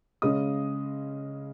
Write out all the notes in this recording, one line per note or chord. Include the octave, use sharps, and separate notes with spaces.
C#3 G#3 C#4 D#5 D#6